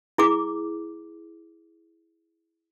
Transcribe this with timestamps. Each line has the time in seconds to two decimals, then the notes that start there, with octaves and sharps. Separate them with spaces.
0.18 E4 G#4 D6